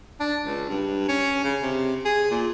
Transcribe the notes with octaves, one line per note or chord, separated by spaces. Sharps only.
D4
C#2
G2
C#4
C#3
C3
G#4
A#2